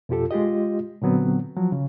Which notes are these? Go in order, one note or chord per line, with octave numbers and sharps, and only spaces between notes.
F2 B2 F4 G4 A4
G#3 F4 G4 D#5
A#2 D3 F#3 B3 C4
F3 F#3
C#3